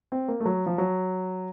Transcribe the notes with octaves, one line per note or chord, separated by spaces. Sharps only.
C4
A#3
A3
F#3
F3
F#3